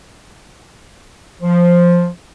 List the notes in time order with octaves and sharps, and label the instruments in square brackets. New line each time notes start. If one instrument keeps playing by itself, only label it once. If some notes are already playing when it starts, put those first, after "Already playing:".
[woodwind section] F3